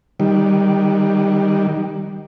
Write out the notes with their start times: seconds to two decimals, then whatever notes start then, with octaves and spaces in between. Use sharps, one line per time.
0.20 D#3 G3